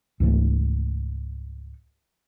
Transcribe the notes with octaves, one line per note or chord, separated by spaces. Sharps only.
C#2 G#2 E3 A3